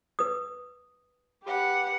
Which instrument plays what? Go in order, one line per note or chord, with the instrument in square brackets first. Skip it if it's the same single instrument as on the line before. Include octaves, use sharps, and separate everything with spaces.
[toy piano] B4 D#6
[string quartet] G4 B4 F#5